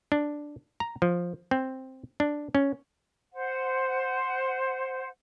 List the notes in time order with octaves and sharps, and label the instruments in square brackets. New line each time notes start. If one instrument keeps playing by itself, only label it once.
[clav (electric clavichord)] D4
A#5
F3
C4
D4
C#4
[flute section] C5 F#5